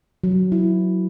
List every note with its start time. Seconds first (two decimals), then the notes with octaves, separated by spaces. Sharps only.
0.24 F#3
0.52 E4